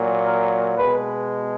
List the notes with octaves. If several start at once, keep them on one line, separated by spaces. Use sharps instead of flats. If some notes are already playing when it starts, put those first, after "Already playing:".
Already playing: A#2 F#3
A#4
B2 G#3 B4